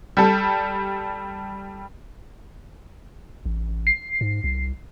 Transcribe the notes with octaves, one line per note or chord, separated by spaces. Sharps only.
G3 A4
A1
C7
G#2
C2